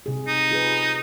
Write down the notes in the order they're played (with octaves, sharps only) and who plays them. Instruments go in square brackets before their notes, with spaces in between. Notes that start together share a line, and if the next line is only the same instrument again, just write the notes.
[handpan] C3 G#4
[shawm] D#4
[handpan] F4 G#4 B4